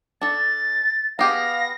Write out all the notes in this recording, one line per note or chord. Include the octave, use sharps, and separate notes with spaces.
D4 A4 A6
B3 G4 G#4 F5 A#6